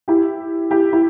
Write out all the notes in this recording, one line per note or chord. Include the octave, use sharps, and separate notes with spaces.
E4 G4
E4 G4
E4